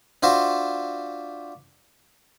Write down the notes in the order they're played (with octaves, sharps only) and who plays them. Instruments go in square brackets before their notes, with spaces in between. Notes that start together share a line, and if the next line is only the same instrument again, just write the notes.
[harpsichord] D4 F4 F#4 C5 E5